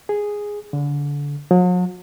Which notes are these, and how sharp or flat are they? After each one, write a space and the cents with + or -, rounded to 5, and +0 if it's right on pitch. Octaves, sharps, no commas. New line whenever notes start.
G#4 -5
D3 -30
F#3 -45